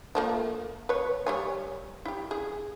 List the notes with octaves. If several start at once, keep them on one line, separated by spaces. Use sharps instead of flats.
F3 A3 A#3
B4 C#5
G3 C#5 G#5
E4 G4
G#4